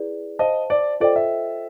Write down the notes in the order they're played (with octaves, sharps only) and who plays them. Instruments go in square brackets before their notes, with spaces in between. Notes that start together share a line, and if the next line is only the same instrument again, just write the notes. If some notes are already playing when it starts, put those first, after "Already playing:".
Already playing: [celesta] E4 G#4 B4 D5
[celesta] C5 F5 A5 [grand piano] D#5
[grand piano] D5
[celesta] F4 A4 C5 D#5 G5 [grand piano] D5
[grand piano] E5